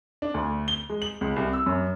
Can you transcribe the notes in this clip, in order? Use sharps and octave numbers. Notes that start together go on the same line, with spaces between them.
D4
D2
G7
G#3
F#7
C#2
C2
E6
F#2